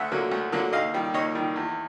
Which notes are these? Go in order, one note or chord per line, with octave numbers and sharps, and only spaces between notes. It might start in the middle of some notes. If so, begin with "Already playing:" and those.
Already playing: D2 E5 F#5
D3 F#3 A#3
D2
D3 F#3 A#3
D#2 D#5 F5
D#3 G3
D#2 C#5 D#5
D#3 G3
E2